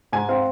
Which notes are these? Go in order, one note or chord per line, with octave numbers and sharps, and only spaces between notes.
G#2 G#5
C4 F5